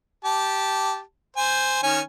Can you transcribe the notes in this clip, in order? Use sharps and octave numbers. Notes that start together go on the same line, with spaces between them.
G4 A5
C5 G#5
D#3 C#4 G#5